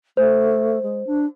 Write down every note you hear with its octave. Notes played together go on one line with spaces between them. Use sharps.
A3 C5
G#3
D4